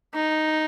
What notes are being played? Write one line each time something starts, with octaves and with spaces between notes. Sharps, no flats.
D#4